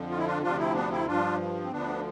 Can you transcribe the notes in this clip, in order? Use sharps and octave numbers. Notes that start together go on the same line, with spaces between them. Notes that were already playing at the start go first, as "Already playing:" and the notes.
Already playing: F2 D3 F3
F4
E4
D4 F4
D2 C3 F3 D4 F4
C4 E4
B3 D4
C4 E4
G2 F3 D4 F4
C4
D2 D3 F3 B3 D4